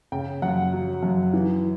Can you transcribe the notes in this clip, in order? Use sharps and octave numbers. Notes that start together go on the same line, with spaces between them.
C#3 G5
F#2 F#5
F#3
F#2
E3